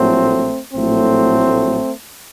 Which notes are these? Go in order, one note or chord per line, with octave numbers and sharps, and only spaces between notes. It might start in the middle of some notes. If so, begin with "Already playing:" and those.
Already playing: A#1 A2 F#3 A3 C4
A#1 A2 F#3 A3 C4